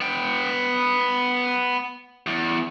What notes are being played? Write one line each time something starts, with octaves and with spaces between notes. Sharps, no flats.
B3 G5
E2